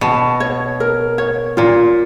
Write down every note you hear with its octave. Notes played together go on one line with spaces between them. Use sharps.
B2 A5
C#5
A#4
C#5
A#2 F4